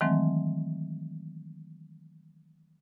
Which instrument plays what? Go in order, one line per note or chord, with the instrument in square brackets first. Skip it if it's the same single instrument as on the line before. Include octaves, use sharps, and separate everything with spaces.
[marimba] D#3 E3 F#3 G#3 A3 C4